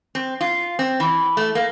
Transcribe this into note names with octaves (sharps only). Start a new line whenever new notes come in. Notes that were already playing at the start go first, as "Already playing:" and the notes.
C4
F4
C4
E3
A3
A#3